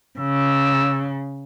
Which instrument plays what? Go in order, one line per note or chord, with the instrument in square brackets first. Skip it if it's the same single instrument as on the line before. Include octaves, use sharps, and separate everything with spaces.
[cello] C#3 [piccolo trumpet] E6